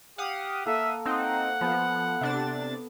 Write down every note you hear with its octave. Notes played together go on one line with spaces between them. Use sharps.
G4 F5 F#5 D#6
A#3 A4 A#4 E5
C4 D#4 F#5
F3 B3 A4
C3 D4 A6